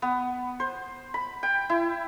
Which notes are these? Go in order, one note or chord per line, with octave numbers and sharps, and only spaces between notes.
B3
C5
B5
G5
E4